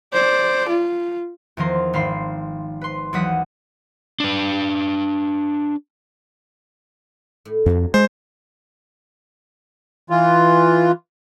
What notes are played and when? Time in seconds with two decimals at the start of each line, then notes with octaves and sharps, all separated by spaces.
0.13 C5 D5
0.69 F4
1.57 E2 D#3 F3 A#4 C6
1.93 G#1 F5 B5 C6 C7
2.81 B4 C6
3.13 D#2 E3 F#3 F#5 D#6 B6
4.20 D4 B4
7.45 A2
7.66 F2 F#3 G3 D4
7.94 G2 G3 G#3 C5
10.10 E3 F4